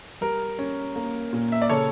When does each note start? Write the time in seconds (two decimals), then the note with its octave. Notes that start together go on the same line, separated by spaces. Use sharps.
0.21 G3 A#4
0.59 C#4
0.96 A#3
1.33 A#2
1.52 E5
1.62 D5
1.69 C#3 A4 C#5